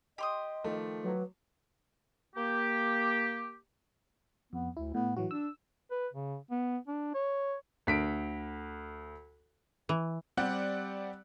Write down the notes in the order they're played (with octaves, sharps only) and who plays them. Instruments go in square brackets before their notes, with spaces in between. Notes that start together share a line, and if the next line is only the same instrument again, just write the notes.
[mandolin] G4 C6 D#6 [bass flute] D#5
[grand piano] D#3 F3 A3
[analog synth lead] F#3 [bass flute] B4
[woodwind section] A#3 G4
[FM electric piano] F2 [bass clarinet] B3
[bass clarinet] D2 [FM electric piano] E4
[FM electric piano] A2 [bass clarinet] B3
[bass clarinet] A2 [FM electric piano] E3 F#3 F#4
[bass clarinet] D4 [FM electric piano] E6
[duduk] B4
C#3
B3
D4
C#5
[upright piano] D2 B6 D7
[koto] E3
[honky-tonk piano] G3 C4 G4 D5 F#5 F#6